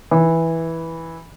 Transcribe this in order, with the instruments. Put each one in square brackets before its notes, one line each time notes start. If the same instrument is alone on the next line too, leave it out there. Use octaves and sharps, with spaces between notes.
[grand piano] E3